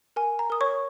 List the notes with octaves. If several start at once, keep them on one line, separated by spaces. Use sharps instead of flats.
A#4 G#5
A#5
A#4 D#6
C#5 C#6